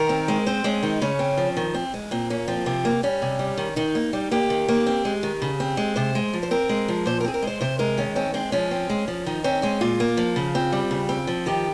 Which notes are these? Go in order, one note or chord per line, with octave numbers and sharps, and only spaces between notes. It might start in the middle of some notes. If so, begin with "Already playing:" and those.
Already playing: D#3 A#4
C4
G#3
C4 C5
G#3 C#4
D#3 D#4
C#3 C#4
C4
F3
D#3
C4
G#3
A#2 C4
A#3 C#4
F3 C4
C3 C4
A#3
G3 C#4
C3
G3
D#3
D#3 D#4
A#3
G3
A#3 G4
D#3
A#3
C4
G#3
D#3
C#3
C4
G#3
C3 C5
G#3
F3
C5
C4 A#4
G#3
F3
A#2 C5
A#4
C4 G#4
A#4
G#3 C5
C3 C5
G#3 A#4
D#3 C#4
C4 C#4
G#3 C4
F3 C#4
C4
G#3
F3
D#3 D#4
C4 C#4
G#3 C#4
A#2 F4
A#3
F3
C#3
C4
G3
C#3
C4
F3
D#3 G4